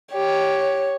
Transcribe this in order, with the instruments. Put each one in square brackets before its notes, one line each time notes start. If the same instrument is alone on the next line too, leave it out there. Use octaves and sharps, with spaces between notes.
[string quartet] G4 [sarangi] C#5